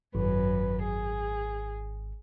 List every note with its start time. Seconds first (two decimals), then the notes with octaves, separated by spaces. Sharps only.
0.15 G#1 F#2 B4
0.83 G#4